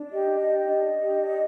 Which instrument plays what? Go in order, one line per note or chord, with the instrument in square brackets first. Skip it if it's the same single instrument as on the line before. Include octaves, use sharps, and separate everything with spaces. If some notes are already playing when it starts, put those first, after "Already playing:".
Already playing: [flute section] D4
G4 D#5
D4
D#5
G4
D#5
D4
D4
G4
D4